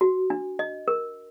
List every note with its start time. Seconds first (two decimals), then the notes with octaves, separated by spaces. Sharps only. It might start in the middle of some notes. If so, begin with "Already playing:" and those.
0.01 F#4
0.30 D4
0.59 D#5
0.88 A#4